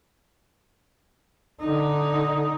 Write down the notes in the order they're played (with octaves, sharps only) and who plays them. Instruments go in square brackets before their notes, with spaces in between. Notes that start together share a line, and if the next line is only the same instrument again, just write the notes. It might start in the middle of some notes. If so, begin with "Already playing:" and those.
[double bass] D3 D#4